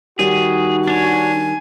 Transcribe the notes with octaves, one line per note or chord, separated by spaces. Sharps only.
D#3 G3 F#4 G#4
D4 C#5 G#5